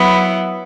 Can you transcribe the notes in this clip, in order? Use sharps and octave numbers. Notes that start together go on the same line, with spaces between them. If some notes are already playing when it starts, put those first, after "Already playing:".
Already playing: F#3 B3 E4